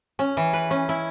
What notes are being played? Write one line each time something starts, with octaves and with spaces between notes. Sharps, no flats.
C#4
E3
B4
C#4
E4